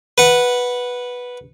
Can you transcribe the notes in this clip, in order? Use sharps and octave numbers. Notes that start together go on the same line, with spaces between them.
B4 F#5